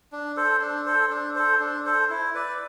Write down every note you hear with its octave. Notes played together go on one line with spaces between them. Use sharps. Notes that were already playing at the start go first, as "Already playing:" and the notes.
D4
A4 C5
D4
A4 C5
D4
A4 C5
D4
A4 C5
E4
B4 D5